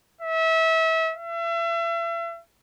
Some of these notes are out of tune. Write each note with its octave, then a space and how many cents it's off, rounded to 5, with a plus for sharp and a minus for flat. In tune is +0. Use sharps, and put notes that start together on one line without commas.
E5 -30
E5 +35